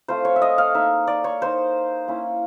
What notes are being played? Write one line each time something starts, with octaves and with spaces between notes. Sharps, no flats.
A3 C4 F4 C5
C#5
E5
D#5
F5
A#3 D#4 E5
D5
C#5
A#3 D#4 C5
A#3 C#4 E4